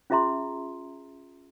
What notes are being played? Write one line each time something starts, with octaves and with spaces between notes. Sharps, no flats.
C#4 F4 G#4 E5 A#5 C6